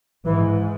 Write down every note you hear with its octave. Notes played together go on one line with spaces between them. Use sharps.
G#2 E3